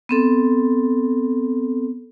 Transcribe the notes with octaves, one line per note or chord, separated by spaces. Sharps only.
B3 C4 A4